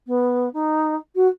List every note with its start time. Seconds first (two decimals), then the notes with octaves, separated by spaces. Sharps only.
0.07 B3
0.54 D#4
1.15 F#4